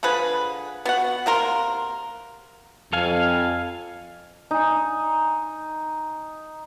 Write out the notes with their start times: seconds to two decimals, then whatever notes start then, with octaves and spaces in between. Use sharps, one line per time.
0.03 D3 F3 G#4 B4
0.85 B3 F#4 F#5
1.26 C3 A#3 A#4 C6
2.93 F2 A4 F5 G#5
4.51 D#4 G#5